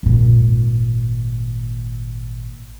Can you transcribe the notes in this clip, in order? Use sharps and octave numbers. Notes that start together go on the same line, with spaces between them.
G#1 A#2